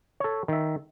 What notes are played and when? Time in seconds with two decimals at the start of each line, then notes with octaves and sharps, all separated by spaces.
0.20 A4 C#5
0.48 D#3 E5